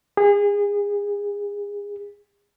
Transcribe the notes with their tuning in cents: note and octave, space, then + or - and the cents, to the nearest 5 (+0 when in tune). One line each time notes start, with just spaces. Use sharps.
G#4 -30